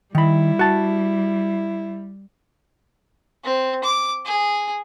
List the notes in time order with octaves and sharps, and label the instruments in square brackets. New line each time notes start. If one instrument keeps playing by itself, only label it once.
[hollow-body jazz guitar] D#3 B5 [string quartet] G3 [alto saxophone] E4
[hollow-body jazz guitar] F#4 A5
[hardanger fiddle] C4
D6
G#4